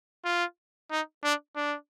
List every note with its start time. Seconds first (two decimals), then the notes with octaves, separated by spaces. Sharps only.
0.24 F4
0.91 D#4
1.24 D4
1.56 D4